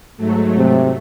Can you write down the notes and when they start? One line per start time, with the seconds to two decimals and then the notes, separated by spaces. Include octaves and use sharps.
0.17 G#2 F#3 A3
0.57 C3